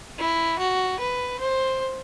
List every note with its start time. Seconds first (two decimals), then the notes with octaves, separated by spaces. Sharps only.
0.19 E4
0.59 F#4
0.99 B4
1.40 C5